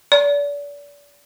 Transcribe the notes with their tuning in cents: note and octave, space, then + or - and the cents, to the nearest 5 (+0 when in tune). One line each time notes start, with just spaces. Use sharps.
D5 -35